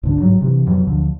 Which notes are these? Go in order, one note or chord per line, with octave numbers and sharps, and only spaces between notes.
C#2 G#2 D3 D4
G#2 F#3
C3 E3
F2 B2 F#3
D2 D3 F3